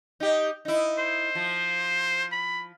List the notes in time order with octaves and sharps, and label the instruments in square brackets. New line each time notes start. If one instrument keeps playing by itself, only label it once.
[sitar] D#4 G4
D#4 E4
[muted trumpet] C5
[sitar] F3
[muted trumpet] B5